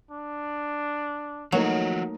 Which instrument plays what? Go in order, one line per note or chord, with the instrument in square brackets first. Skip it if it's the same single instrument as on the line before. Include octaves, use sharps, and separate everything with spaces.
[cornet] D4
[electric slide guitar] F3 F#4 [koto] F#3 [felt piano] A3 A#3 D#4